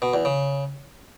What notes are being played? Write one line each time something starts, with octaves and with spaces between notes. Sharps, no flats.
B2
E2
C#3